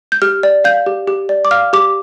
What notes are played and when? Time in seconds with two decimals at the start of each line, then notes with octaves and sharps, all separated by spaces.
0.12 G6
0.22 G4 F6
0.43 D5
0.64 F5 G6
0.86 G4
1.08 G4
1.29 D5
1.45 D6
1.51 F5 F6
1.73 G4 D6